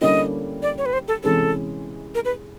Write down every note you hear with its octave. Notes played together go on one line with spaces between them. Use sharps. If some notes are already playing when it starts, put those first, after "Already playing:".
D3 G3 A#3 C#4 E4 D#5
D5
C#5
B4
C5
A4
C3 E3 G#3 C#4 A4
A#4
B4